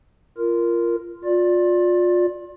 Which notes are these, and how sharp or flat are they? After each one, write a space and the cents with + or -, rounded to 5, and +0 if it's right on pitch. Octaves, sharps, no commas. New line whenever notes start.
F4 -15 A#4 +0
F4 +30 D5 +0